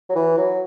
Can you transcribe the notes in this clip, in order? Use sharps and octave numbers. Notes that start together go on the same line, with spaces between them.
F#3
E3
F#3